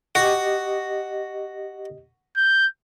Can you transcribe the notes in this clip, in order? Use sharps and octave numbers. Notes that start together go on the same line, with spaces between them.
F#4 G4 D#5
G6